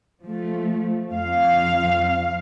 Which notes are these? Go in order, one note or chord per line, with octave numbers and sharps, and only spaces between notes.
F3 A3
F2 F5